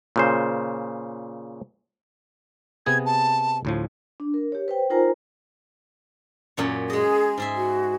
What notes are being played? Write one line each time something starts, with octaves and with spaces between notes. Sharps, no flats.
A#2 C#3 C5
C3 B3 G#4 G#6
A5
D2 A2 F3
D4
A#4
G4 C#5
B4 C5 G5
D#4 F4 A#4 C5 G#5 A#5
F#2 A#2 C#5
G#3 G#4 D#5
G#2 G#4 E5
F#4